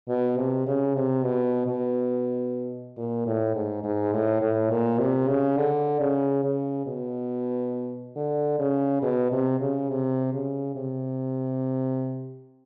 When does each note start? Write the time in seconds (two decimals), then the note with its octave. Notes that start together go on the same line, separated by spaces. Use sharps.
0.08 B2
0.37 C3
0.67 C#3
0.94 C3
1.23 B2
1.67 B2
2.97 A#2
3.26 A2
3.55 G#2
3.84 G#2
4.13 A2
4.41 A2
4.70 A#2
4.99 C3
5.28 C#3
5.57 D3
6.00 C#3
6.43 C#3
6.86 B2
8.16 D3
8.59 C#3
9.02 B2
9.32 C3
9.60 C#3
9.90 C3
10.33 C#3
10.76 C3